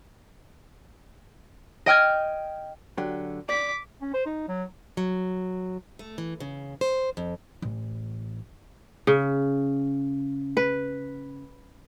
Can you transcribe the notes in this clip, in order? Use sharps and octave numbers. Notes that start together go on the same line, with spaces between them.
D#5 G5 F6 G#6
D3 F#3 G4
D5 D6 B6
C#4
C5
D#4
F#3
F#3
A3
E3
C#3
C5
F2
A1
C#3
B4